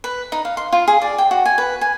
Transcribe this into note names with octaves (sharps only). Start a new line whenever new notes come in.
B4
D#4
F5
C6
F4
G#4
D5
G5
F#4
G#5
B4
G#5